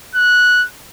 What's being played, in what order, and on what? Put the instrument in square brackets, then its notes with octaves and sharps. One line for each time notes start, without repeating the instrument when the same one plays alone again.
[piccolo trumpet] F#6